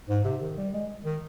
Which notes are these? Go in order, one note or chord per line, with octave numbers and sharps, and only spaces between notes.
G#2
C3
D#3
G3
G#3
D#3